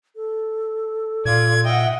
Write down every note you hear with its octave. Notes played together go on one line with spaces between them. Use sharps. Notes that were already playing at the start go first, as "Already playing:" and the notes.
A4
A#2 F4 D5 G#6
D#5 E5 F#5 G5